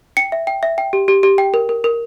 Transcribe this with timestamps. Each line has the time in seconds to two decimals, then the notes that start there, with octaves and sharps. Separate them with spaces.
0.17 G5 C#7
0.32 E5
0.47 G5
0.63 E5
0.78 G5
0.93 G4
1.08 G4
1.23 G4
1.38 G5
1.54 A#4
1.69 A#4
1.84 A#4